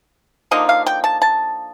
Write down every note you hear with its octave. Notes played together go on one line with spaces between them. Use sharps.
D3 F3 A#3 D#4 D#5
F5
G5
A5
A5